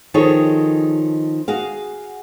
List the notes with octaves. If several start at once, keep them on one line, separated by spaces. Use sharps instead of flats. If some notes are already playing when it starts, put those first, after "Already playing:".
D#3 F3 D#4 G#4 A4 C#5
F#4 G#4 F5